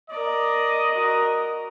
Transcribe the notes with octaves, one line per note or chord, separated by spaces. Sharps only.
A#4 D5 D#5
F#4 A#4